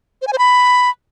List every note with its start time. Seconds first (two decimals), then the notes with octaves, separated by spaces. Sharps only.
0.22 C5
0.27 G#5
0.33 C5
0.38 B5